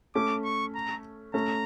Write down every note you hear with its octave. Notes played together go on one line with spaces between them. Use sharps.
A3 C#4 D6
C#6
A#5
A3 C#4 A#5